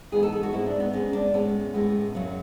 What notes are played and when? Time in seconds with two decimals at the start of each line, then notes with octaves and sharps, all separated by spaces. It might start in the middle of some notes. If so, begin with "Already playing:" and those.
0.12 G#2 E3 G#3 B3 G#4
0.23 A4
0.33 G#4
0.43 F#4
0.52 G#2 G#3 B3 E4
0.66 D4
0.80 B3
0.93 G#2 G#3 B3 C#4
1.13 D4
1.33 A2 G#3 B3 C#4
1.74 A2 G#3 B3
2.14 F#2 C#3 F#3